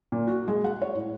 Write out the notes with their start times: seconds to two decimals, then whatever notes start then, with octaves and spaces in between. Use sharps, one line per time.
0.12 A#2
0.27 F#4
0.48 G#3
0.64 F#5
0.82 C#5
0.95 A2